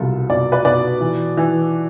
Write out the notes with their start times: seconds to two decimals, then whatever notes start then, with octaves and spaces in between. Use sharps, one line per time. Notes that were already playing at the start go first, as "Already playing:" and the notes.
Already playing: C2 B2 F4 A4
0.30 B2 D5
0.52 B4 D5
0.65 B2 B4 D5
1.01 E3
1.37 E3